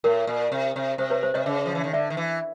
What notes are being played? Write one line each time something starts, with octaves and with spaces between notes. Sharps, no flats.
A2 A#4
A#2
C3
C3
C3 C5
B4 C#5
C5
C3 C#5 D#5
C#3
F3
E3
D#3
D3 D5 E5
D#3
E3